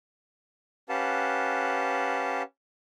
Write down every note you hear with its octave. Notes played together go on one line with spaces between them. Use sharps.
C#4 G4 B4 F5 F#5 A5